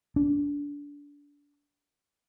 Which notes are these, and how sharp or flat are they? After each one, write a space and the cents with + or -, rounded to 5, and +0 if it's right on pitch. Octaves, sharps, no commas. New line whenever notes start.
D4 -25